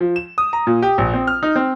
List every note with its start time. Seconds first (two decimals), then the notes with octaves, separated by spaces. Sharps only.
0.01 F3
0.16 E7
0.38 D#6
0.53 A#5
0.67 A#2
0.82 G4
0.98 A#1
1.14 C4
1.27 F6
1.43 D#4
1.56 C4